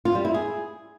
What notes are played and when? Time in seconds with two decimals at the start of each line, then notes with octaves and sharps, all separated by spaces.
0.05 F4
0.15 G3
0.25 E4
0.34 G#4